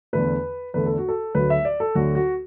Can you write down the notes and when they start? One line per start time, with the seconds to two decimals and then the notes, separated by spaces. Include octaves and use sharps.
0.13 E2 D3 A3 B4
0.74 E2 D3 A3 B4
0.86 A4
0.98 F#4
1.08 A4
1.34 D2 D3 F#3 A3 B4
1.50 E5
1.65 D5
1.80 A4
1.95 D2 D3 F#3 A3 F#4
2.15 F#4